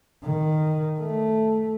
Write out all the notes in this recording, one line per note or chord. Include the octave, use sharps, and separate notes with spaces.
D#3
A3